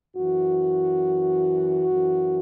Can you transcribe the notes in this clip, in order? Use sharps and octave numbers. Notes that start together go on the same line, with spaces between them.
F#2 E3 F#4
F#2 E3